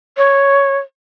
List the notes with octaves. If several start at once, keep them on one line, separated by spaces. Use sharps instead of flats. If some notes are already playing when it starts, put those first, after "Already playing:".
C#5